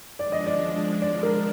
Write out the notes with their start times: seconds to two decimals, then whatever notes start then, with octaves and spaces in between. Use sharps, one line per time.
0.19 F3 G#3 D4 D5
0.32 D#5
0.46 D5
1.02 D5
1.23 A#4